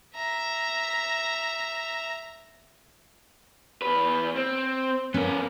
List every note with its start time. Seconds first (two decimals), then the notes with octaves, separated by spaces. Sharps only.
0.15 E5 A#5
3.82 E2 B4
4.36 C4
5.14 B3 C#4 A#4